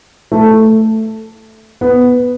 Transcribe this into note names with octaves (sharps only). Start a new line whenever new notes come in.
A3
B3